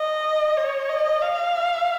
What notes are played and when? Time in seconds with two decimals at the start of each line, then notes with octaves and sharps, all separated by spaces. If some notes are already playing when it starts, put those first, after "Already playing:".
Already playing: D#5
0.57 C#5
0.89 D#5
1.22 F5